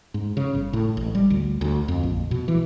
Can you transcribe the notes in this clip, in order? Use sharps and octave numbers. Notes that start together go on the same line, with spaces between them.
G#2
C#3
G1
A2
A1
G3
D2
D2
F2
A#1
B2
E3